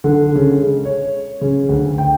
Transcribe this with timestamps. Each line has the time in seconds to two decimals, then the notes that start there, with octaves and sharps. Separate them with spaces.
0.04 D3
0.36 C#3
0.61 G#3
0.85 C#5
1.41 C#3
1.69 D2
1.98 G5